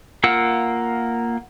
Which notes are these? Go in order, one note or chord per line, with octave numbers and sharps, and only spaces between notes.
A#3 F4 A#4 F#5 E6